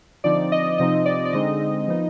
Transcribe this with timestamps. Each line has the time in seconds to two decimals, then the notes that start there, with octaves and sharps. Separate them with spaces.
0.24 D3 F3 C4 D#4 D5
0.52 D#5
0.78 C3 F3 C4 D#4 D#5
1.06 D5
1.25 D5
1.33 D3 G#3 C4 D#4 D#5
1.88 F3 B3 D#4